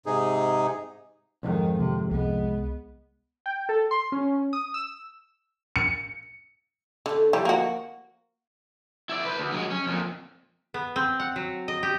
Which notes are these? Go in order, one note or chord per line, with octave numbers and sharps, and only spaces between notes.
G#2 C3 D#4 G#4
B1 F2 G#2 D#3
C3 D#3 A#3
C2 G#3 B3
G5
A4
C6
C#4
D#6
E6
C#7
D3 A3 A4
D3 E3 F3 G3
A#3 F#4
E4 D5
B4 C5
D2
F#3 G#3
C#4
F2 A#2
B3
C4
F#5
F#3
D#5
G4